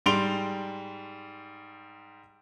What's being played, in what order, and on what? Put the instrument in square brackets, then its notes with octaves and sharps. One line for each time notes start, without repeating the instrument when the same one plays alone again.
[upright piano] G#2 G3 C6 D7 F7 G7